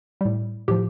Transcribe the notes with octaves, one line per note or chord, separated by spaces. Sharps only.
A2 G3
A2 F3 G4